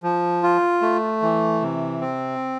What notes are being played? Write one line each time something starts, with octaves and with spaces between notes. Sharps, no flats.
F3
F4
A3
E3
C3
C4